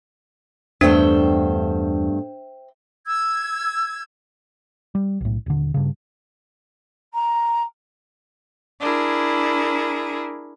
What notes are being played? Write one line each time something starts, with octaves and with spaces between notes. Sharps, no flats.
E2 G2 A3 B3 D4 C5 E5 G5
E6 G#6
G3
B1 A2
D#1 D3
G2 C#3
A#5
D4 E4 G#4 A#4